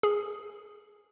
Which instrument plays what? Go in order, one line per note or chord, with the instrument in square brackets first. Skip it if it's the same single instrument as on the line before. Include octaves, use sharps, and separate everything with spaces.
[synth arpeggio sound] G#4